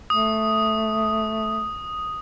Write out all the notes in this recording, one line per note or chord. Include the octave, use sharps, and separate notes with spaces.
A3 D#6